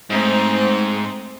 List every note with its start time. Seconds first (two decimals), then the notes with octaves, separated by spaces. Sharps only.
0.10 G#2 A3 C4 D#4